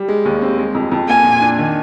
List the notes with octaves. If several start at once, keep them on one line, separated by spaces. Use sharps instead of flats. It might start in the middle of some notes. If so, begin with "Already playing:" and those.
Already playing: G3
G#3
D#2
C4
G#3
F2
F2
A#3 G#5
A#2
D4
D#3